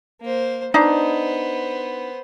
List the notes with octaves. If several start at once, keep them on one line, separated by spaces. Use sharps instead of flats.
A#3 C5
B3 D4 D#4 C5